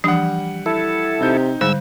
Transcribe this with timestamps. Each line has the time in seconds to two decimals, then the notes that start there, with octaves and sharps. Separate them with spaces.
0.04 E3 F3 G3 D4 F#5
0.66 E4 A4
1.21 C3 C4 D#4 G6
1.61 G#2 D3 G3 C5 E6